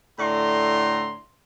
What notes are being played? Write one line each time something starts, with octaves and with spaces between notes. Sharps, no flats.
A2 D3 E4 D5 A#5 C6